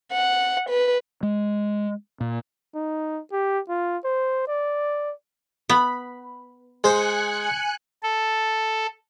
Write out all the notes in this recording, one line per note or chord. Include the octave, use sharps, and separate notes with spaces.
F#5
B4
G#3
A#2
D#4
G4
F4
C5
D5
B3 B5
G#3 C5 G#5 F#6 C#7
A4